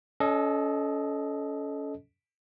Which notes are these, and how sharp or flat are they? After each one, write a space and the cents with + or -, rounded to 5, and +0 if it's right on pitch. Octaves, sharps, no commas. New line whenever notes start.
C#4 +25 A4 -20 D#5 +0